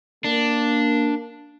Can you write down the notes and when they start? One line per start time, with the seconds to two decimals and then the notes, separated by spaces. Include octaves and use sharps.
0.24 A#3 D4